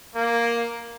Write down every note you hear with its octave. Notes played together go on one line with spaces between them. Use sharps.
A#3